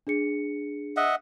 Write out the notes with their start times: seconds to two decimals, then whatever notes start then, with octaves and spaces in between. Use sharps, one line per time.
0.07 D4 G#4 C#7
0.96 D#5 E5 F#5